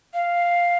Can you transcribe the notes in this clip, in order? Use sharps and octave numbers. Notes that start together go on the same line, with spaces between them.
F5